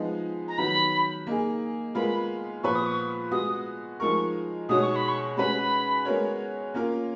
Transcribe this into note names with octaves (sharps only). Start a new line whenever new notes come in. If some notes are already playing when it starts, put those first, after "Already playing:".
Already playing: F3 G#3 B3 D#4
A#5
D#3 F#3 B3 B5
A#3 D#4 G#4
G#3 B3 F4 A#4 B5
A#2 F3 B3 F4 B4 C#6
D#6
C#6
G#3 B3 F#4 D#6
F3 G#3 D#4 A#4 C#6
B2 G#3 D#4 F#4 C#5 D#6
C#6
B5
C#6
G#3 C#4 F#4 B4 B5
G#3 B3 F#4 A#4 C#5
A#3 C#4 F4 A#4